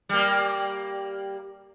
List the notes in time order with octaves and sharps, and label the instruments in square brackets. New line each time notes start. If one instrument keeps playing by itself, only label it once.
[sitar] G3 A#3